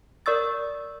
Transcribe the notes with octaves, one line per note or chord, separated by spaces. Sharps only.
A#4 D5 C#6 E6 A6